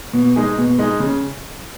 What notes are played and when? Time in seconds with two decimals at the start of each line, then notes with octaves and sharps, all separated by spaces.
0.13 B2
0.36 G#3 D#4 G#4
0.58 B2
0.79 G#3 D#4 G#4
1.00 C#3